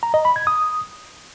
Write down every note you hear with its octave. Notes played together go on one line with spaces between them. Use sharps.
A#5
D#5
B5
G#6
D#6